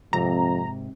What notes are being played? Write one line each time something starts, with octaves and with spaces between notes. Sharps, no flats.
F2 G#2 C3 A#5